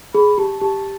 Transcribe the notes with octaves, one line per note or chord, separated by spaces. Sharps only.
G#4 B5
G4 A5
G4 A5